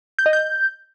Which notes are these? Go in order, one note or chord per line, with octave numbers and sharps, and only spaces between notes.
G6
D#5
G6